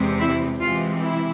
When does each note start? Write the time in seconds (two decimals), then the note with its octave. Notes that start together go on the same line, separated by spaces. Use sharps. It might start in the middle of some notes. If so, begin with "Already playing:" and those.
Already playing: E2 C3 G#3 C4
0.19 E4
0.60 C3 E3 G#3 F4
1.01 E4